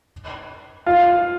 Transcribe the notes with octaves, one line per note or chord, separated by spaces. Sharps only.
F4